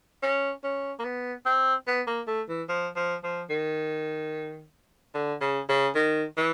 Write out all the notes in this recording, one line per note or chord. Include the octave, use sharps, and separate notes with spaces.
C#4
C#4
A#3
B3
C4
B3
A#3
A3
E3
F3
F3
F3
D#3
D3
C#3
C#3
D#3
E3